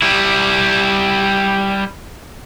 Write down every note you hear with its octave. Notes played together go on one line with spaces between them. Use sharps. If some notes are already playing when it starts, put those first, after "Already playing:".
G3 E4